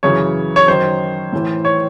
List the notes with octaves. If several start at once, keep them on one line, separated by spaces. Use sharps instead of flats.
F#2 C#3 E3 C#5
C#5
F#2 D#3 C5
A2 E3
C#5